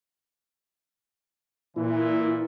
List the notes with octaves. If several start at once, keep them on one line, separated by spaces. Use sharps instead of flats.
A#2 E3 E4